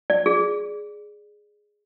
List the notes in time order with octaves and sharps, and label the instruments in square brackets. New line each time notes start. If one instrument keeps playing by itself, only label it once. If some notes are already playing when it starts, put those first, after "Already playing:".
[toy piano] D5
G#4